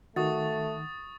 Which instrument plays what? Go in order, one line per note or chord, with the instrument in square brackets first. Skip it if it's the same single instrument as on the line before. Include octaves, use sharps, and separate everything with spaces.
[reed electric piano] D#3 [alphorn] A3 [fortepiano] F#4 [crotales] C#6 D#6 A6